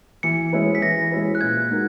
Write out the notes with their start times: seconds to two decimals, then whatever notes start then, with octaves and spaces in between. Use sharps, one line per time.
0.23 E3 C#7
0.53 G#3 C#4 E4 B4
0.75 B6
0.82 E3 A#6
1.12 G#3 C#4 E4 B4
1.35 F#6
1.41 A#2 G#6
1.71 G#3 D#4 F#4 A#4